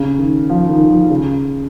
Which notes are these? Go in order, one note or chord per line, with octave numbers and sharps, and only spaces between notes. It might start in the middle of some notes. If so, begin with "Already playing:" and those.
Already playing: C#3
D#3
F3
D#3
D#3
F3
C#3